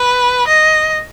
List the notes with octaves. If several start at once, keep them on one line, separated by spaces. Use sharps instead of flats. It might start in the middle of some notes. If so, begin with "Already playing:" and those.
Already playing: B4
D#5